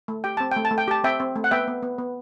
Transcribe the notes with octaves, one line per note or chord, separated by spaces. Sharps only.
A3
G4 G5
C4 A5
A3 G5
A5
A3
G5
G4 A5
C4 E5 G5
C4
A3
F#5
B3 E5 G5
B3
B3
B3